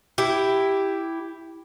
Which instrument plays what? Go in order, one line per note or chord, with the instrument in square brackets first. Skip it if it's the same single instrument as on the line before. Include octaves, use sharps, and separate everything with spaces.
[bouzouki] E4 G4